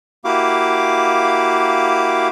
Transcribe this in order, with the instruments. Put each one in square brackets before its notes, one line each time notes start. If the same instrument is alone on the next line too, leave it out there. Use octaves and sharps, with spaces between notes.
[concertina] A#3 E4 F#4 G4 F5 D6